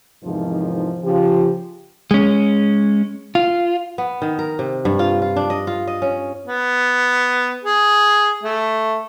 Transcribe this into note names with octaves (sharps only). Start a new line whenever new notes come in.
E2 G#2 C3 D#3 F3
C#3 F3 G4
G#3 C#4
F4
B3
D#3
A#4
C3
G2
F4
F4
D4
D#5
F4
D#5
C#4
B3
G#4
A3